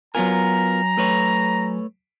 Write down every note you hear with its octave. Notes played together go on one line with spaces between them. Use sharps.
F#3 B3 F4 A#4 G#5 A#5
A3 B4 C#5